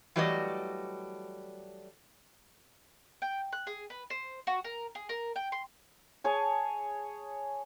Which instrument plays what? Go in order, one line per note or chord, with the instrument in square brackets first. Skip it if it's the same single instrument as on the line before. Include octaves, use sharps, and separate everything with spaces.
[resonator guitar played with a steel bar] E3 F#3 G3 A3 D5 D#5
[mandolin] G5
F#6
G#4
B4
C5
F#4
A#4
G#4
A#4
G5
C6
[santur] G#4 C#5 A5